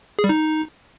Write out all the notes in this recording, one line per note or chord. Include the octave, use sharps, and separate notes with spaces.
G#4
G3
D#4